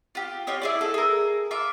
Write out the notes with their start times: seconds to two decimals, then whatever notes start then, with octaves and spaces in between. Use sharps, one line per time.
0.15 F4 G4
0.47 F4 G4 C#5 D#5
0.62 E4 G#4 D5
0.81 A4
0.94 G#4 A#4
1.51 F4 E5 D6